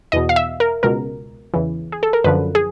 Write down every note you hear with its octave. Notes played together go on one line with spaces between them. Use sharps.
E2 B2 D#5
F5
E5
A#4
C#2 B2 A#4
E2 C#3 E3
G#4
A4
A#4
F#2 D3 F3 B4
G#4